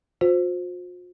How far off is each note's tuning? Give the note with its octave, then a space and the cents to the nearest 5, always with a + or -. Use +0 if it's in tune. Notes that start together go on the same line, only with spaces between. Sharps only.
F4 +45 C5 +0